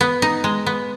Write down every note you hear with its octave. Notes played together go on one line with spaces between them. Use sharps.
B3
D#4
G#3
B3